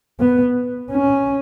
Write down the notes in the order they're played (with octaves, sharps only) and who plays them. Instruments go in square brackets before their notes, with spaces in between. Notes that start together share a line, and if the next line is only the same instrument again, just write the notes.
[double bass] B3
C#4